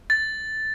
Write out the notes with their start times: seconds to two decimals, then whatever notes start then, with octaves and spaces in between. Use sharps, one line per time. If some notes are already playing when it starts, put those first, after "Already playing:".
0.10 A6